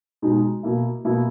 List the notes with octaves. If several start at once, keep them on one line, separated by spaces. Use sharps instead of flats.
B2 G#3 D#4
B2 A#3 E4
B2 A#3 E4